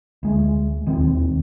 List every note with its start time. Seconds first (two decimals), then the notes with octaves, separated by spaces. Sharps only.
0.23 D2 G#3
0.86 E1 D#2 D#3 C4